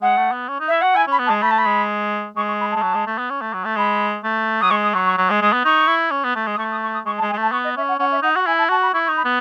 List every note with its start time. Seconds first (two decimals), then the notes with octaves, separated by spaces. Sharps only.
0.01 G#3 F#5
0.17 A3
0.32 B3
0.48 C#4
0.61 D#4
0.67 E4 E5
0.81 F#4 F#5
0.95 E4 G#5
1.07 C#4 B5
1.19 B3
1.26 A5
1.30 G#3
1.42 A3 B5
1.51 A5
1.58 B5
1.66 G#3
2.36 G#3 C#6
2.47 C#6
2.60 B5
2.71 A5
2.76 G#3
2.82 F#3
2.95 G#3
3.07 A3
3.18 B3
3.30 C#4
3.42 A3
3.53 F#3
3.65 A3
3.76 G#3 B5
4.24 A3
4.60 F#3 D#6
4.70 G#3 C#6
4.83 D#6
4.94 F#3 C#6
5.06 C#6
5.18 F#3
5.30 G#3
5.42 G#3 D#6
5.53 B3
5.65 D#4 C#6
5.88 E4
6.11 C#4
6.24 B3
6.35 A3
6.47 G#3
6.54 D#6
6.58 A3 C#6
6.71 D#6
6.82 C#6
6.93 D#6
7.06 G#3 C#6
7.18 A5
7.22 G#3
7.29 G#5
7.33 G#3
7.37 A3 A5
7.52 B3 C#6
7.64 D#5
7.77 C#4 E5
7.88 F#5
7.99 C#4 F#5
8.12 E5
8.23 D#4 F#5
8.35 F#4 F#5
8.46 E4 G#5
8.58 A5
8.69 F#4 A5
8.82 B5
8.93 E4 C#6
9.06 C#6
9.09 D#4
9.16 B5
9.25 B3